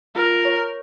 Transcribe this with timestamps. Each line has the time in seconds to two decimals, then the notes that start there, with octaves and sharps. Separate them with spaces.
0.16 F4 A#4
0.45 C#5